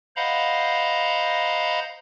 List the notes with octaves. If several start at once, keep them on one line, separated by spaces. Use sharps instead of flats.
C5 D#5 F5 F#5 A#5 B5